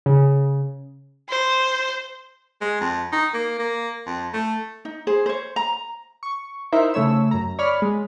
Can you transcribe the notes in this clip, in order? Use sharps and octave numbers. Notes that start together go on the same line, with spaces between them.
C#3
C5
G#3
F2
D#4
A#3
A#3
F2
A3
D#4
G#4 C5
C5 C#5
A#5
C#6
D#4 E4 A#4 C5 E5
C#3 A3 C#5 E6
F#2 A#5
C#5 D5 B5 F6
G#3